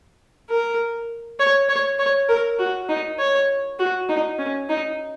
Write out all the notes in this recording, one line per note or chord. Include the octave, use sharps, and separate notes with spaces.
A#4
C#5
C#5
C#5
A#4
F#4
D#4
C#5
F#4
D#4
C#4
D#4